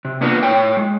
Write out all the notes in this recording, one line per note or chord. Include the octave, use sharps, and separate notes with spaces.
C3
A#3 B3 D4 F4 A#4
A2 C#5 G5
G#3